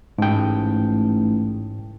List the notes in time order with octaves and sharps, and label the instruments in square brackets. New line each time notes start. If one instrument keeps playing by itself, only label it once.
[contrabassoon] A1 [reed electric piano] G#2 G5 [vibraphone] A3 D#4